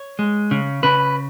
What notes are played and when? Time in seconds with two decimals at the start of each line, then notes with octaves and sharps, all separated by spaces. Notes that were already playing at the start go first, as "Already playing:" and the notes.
Already playing: C#5
0.19 G#3
0.51 C#3
0.83 C#3 B4